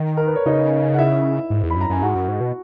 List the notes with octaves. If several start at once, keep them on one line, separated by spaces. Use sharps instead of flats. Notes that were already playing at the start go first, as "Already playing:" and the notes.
Already playing: D#3
A#4
B4
C#5
C#3 D#4 D#5
F#5
E4 E5
G#2
E2
B5
F#2
A#5
F#2 G#5
G#2 F#4 F#5
F#2
G#2
B2